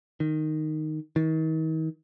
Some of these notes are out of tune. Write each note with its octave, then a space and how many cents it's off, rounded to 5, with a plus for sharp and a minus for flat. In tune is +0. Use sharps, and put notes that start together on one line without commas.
D#3 -5
D#3 +40